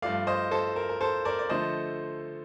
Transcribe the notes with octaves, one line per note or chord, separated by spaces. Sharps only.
G2 F3 A3 D5 F5
C5 D#5
A4 C5
A#4
A#4
A4 C5
A#4 D5
D5
D3 F3 A3 C5 D#5